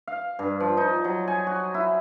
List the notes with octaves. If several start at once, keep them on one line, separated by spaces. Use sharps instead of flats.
F5
G2
F3
D#4
F#3
G#5
F#4
E4